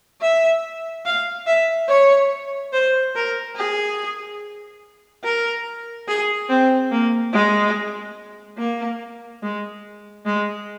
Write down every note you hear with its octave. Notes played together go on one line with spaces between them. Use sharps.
E5
F5
E5
C#5
C5
A#4
G#4
A#4
G#4
C4
A#3
G#3
A#3
G#3
G#3